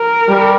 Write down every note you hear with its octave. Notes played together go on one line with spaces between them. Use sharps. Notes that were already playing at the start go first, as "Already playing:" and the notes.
Already playing: A#4
G3